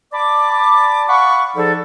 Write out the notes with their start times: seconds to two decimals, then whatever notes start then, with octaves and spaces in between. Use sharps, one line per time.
0.13 D5 A5 B5 D6
1.08 F5 F#5 B5 C#6
1.56 F3 D#4 G#4 A4 D5